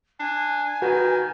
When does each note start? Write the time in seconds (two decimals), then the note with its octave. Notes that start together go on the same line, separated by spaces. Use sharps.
0.20 D4 G#5
0.82 D#3 F#4 B4